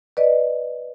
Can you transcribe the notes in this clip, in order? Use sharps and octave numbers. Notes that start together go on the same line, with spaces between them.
B4 D5 D#5